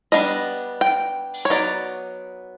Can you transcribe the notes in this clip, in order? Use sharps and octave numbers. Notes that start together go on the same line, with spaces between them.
G3 B3 D4 D#5
G5
C#5
F#3 B3 D#4 D5